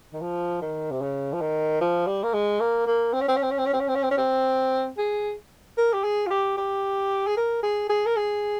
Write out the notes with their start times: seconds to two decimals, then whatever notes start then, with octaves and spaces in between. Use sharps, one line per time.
0.13 D#3
0.21 F3
0.61 D#3
0.91 C3
1.01 C#3
1.33 F3
1.41 D#3
1.81 F3
2.07 G3
2.23 A#3
2.34 G#3
2.60 A#3
2.87 A#3
3.13 C4
3.21 C#4
3.28 C4
3.36 C#4
3.43 C4
3.51 C#4
3.58 C4
3.66 C#4
3.73 C4
3.80 C#4
3.88 C4
3.95 C#4
4.03 C4
4.11 C#4
4.17 C4
4.98 G#4
5.77 A#4
5.93 G4
6.04 G#4
6.26 F4
6.30 G4
6.57 G4
7.27 G#4
7.37 A#4
7.63 G#4
7.89 G#4
8.06 A#4
8.17 G#4